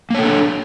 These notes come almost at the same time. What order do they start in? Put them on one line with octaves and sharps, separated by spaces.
A#3 C#5 A4 D4